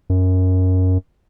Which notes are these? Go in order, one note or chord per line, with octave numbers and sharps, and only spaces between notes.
F#2